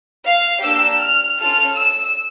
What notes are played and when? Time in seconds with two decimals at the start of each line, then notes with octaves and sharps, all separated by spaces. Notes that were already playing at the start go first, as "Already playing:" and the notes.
0.26 F5
0.63 A#3 D4 G4 E6
1.01 F6
1.38 C#4 F4 A4 F6
1.76 E6